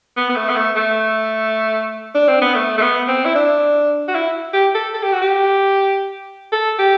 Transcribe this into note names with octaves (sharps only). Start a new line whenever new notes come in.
B3
B3
A3
B3
A3
A3
D4
C4
B3
A3
A3
B3
C4
E4
D4
F#4
E4
G4
A4
A4
G4
F#4
G4
A4
G4